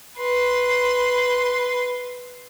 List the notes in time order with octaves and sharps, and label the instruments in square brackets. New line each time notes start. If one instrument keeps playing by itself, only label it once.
[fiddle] B4 C6